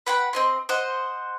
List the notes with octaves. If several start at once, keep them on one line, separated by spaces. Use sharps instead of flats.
B4 F#5 G5 B5
C4 D#5 C6
C5 D#5 F#5